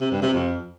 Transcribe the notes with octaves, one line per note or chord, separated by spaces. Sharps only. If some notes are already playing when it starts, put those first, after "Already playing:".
C3
G2
C3
F2